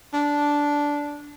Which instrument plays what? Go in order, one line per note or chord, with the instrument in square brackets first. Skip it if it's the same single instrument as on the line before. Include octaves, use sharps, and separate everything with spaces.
[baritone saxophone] D4